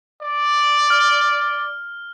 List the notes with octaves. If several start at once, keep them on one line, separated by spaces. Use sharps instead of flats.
D5
F6